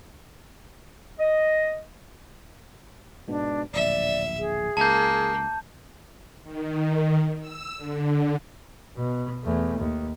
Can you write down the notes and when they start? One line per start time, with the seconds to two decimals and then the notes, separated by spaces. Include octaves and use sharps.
1.19 D#5
3.28 G#2 B2 D4
3.74 D1 A#1 D5 E5
4.38 G#4
4.77 C#2 A#3 A5 G6
6.43 D#3
7.40 E6
7.76 D3
8.97 B2
9.44 E2 A3
9.79 D#2